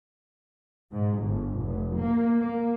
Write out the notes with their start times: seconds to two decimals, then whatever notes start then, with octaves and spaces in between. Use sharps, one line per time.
0.91 G#2
1.21 G1
1.63 F1
1.97 A#3
2.38 A#3